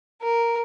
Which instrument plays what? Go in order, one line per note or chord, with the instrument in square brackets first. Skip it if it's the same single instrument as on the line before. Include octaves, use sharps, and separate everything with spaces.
[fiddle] A#4